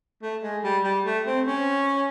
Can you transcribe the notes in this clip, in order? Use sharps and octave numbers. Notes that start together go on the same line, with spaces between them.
A3
G#3
G3
G3
A3
C4
C#4